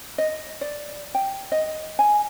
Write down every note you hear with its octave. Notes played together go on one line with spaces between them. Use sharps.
D#5
D5
G5
D#5
G#5